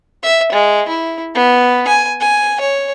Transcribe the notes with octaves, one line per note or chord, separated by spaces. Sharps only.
E5
G#3
E4
B3
G#5
G#5
C#5